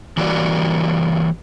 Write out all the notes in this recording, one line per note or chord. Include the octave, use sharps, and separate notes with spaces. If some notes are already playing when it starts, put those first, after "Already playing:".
E3 G3 A#3 F#4 D5